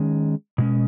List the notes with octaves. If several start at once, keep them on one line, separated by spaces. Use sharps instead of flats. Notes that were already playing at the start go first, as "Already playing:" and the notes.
Already playing: D#3 G#3 C#4
B2 G#3 C#4